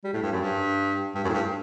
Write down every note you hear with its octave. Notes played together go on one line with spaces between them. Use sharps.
G3
A2
G2
F#2
G2
G2
F#2
A2
G2